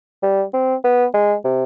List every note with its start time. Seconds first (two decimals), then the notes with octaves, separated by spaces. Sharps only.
0.23 G3
0.54 C4
0.84 B3
1.14 G#3
1.45 C3